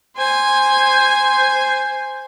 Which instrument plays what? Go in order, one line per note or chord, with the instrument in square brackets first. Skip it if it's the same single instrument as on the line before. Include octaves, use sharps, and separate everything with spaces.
[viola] C5 G#5